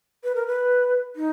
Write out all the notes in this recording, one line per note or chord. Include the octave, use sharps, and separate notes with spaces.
B4
A#4
B4
D#4